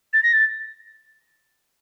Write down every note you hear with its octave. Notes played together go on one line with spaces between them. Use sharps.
A6
A#6
A6